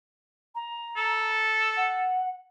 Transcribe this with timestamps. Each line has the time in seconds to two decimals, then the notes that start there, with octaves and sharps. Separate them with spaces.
0.54 A#5
0.97 A4
1.76 F#5